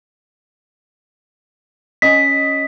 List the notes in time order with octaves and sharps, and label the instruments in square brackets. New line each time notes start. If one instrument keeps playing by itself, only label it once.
[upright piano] C#4 D#5 [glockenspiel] B6